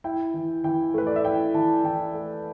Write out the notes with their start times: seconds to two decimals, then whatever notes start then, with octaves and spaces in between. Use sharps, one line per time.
0.04 E4 G5
0.34 E3
0.64 E3 G5
0.94 A3 B4
1.07 D5
1.16 E5
1.25 E4 G5
1.54 E3 A5
1.84 E3 G5
2.14 A3